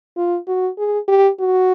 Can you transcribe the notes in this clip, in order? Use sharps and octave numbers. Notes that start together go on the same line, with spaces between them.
F4
F#4
G#4
G4
F#4